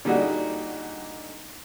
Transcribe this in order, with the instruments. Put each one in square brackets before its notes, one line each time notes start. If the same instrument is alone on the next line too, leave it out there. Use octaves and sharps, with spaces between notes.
[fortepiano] A#2 D3 G3 D#4 F#4 G#4